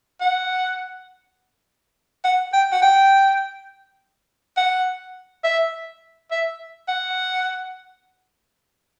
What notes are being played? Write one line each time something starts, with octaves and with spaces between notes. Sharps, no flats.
F#5
F#5
G5
F#5
G5
F#5
E5
E5
F#5